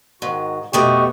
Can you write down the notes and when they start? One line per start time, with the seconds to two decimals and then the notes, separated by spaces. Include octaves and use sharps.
0.22 G#2 D#3 F#4
0.73 F2 B2 A3 G4 D#5 F#5 C#6